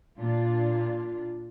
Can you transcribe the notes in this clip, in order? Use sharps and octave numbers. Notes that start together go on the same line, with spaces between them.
A#2 D4 F4